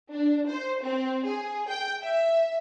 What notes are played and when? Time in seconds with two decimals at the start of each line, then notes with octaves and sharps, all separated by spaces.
0.11 D4
0.49 C5
0.82 C4
1.26 G#4
1.68 G5
2.02 E5